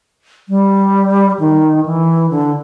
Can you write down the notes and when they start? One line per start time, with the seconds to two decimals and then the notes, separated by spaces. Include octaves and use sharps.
0.49 G3
1.39 D#3
1.86 E3
2.31 D3